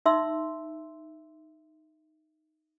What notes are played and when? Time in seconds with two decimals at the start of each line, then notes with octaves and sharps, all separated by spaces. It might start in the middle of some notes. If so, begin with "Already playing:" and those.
0.05 D#4 E5 C6 E6